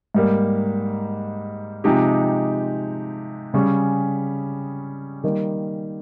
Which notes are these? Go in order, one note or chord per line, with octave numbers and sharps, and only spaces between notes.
G#2 G3 A#3
C3 F3 G#3 D#4 G4
C#3 G3 C#4 G#4
D#3 G3 A#3